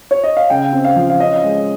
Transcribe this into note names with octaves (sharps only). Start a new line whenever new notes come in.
C#5
D#5
F5
C#3 G5
C4
F5
F3
F5
C#4 D#5
G#3